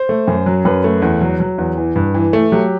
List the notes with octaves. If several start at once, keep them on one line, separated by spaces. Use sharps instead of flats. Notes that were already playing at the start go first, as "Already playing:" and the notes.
Already playing: C5
A3
F#2
F#3
F#2 B4
A3
E2
F#3
F#3
E2
E3
G2
E3
A3
F#3 G4